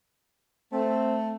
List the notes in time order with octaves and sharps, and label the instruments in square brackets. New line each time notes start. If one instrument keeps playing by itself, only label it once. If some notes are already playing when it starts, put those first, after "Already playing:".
[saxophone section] A3 [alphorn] C4